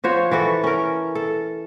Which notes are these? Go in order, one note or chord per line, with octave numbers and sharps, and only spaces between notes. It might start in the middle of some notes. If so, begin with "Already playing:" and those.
F3 F#4 C5 C#5
E3 F#4 A4
C#4 A#4
A4